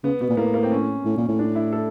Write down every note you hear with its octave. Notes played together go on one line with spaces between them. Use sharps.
C#3 B3
B2 B3
A#2
A2 A#3
A#3
C4
C#4
A2
A#2
A2
D4
E4
A4